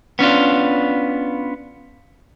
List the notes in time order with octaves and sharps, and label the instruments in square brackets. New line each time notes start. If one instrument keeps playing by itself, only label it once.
[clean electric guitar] B3 C#4 D4 F4